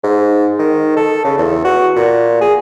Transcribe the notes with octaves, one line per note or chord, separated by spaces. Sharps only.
G#2
D#3
A4
C#3
E2
F#4
A#2
G#4